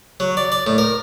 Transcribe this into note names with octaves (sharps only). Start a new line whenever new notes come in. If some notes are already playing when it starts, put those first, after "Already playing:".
F#3
D5
D5
A2
A#4